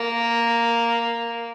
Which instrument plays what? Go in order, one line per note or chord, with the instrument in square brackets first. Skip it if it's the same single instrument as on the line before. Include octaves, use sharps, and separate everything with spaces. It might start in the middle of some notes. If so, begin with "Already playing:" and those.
Already playing: [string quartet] A#3